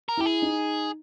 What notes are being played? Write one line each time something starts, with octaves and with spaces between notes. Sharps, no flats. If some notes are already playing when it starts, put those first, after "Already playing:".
A#4
E4 G4
G#4
D#4